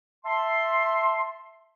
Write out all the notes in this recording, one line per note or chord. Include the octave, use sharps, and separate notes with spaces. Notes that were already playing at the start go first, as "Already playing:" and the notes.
E5 A5 C6